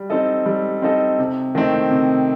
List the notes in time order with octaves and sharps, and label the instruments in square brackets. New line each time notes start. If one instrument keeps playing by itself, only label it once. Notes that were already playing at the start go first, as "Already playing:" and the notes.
Already playing: [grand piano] G3
C4 D#4 A4 D#5
G3
C4 D#4 A4 D#5
C3
D#3 A3 C4 D#4
C3